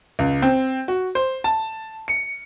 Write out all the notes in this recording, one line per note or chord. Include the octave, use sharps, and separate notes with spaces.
C#2
C4
F#4
C5
A5
C#7